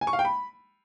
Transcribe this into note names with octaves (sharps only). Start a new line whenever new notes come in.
G#5
C#6
F5
G5
B5